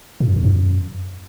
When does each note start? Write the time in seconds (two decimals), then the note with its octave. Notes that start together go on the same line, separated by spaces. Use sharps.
0.20 A2
0.28 F#2
0.36 E2
0.44 F#2